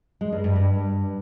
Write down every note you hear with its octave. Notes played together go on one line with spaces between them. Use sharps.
G#3
G2
G2
G2